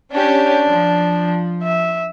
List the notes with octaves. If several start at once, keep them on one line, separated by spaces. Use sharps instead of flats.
C#4 D4 G4
F3
E5